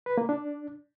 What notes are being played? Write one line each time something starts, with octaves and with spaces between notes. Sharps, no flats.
B4
A#3
D4